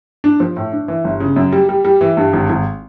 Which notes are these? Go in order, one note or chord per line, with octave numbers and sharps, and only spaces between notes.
D4
F3
A2
D4
E3
G1
C#3
F#2
G3
G3
G3
E3
G2
G#1
G#1